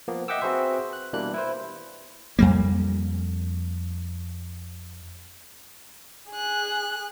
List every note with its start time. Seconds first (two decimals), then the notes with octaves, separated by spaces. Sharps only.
0.08 F3 A#3 B3
0.28 D#5 E5 F#5 G5 D6 E6
0.41 C4 F#4 G#4 B4 C5 E5
0.93 F#6
1.13 B2 E3 G3 A#3 D4 F#6
1.34 E4 B4 C5
2.39 F2 G3 A#3
6.30 G#4 F#6